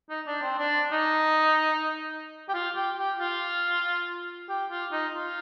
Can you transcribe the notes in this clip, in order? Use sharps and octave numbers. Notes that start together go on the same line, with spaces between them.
D#4
D4
C4
D4
D#4
G4
F4
G4
G4
F4
G4
F4
D#4
F4